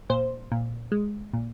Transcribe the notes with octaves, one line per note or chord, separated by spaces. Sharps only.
A#2 C5
A#2
G#3
A#2